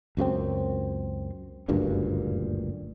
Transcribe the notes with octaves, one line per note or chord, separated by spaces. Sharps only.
C#2 F#2 A3 C4
F#1 D2 G2 A#2